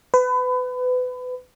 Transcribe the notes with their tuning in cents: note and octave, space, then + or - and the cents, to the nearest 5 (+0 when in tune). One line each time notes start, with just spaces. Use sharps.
B4 +30